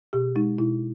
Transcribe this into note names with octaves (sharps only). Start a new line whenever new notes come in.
B2 G4
G#3 D#4
B2 E4